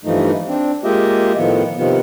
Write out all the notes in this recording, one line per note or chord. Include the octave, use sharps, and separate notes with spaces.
G2 E3 F3 A3 D#4
C4 D4
G#3 A#3 F4 G4 D#5 E5
A2 D#3 F3 B3
C3 D#3 F3 B3